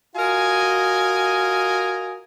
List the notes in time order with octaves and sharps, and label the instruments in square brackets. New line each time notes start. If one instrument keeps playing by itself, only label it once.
[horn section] F4 F#4 A#4 D#5 G#5